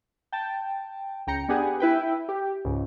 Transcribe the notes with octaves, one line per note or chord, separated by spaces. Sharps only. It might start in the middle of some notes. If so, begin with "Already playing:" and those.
G5 A5
C#2 G5 A#5 C#7
B3 D4 G4 G#4 F#5 G#5
E4 B4 G5
G4
C#2 G#2